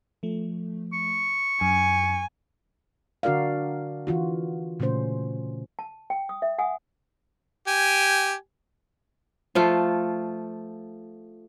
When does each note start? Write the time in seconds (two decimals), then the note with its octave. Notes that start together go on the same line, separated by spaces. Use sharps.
0.23 F3 A3
0.93 C#6
1.61 F#2 G#5
3.23 D3 D4 F#4 A#4 D5 F5
4.07 E3 F4 F#4
4.80 A#2 C#3 A3 C#4 C5
5.79 A5
6.10 G5
6.29 D#6
6.42 E5
6.58 F#5 G#5 D#6
7.68 G4 G#5
9.55 F3 A3 F4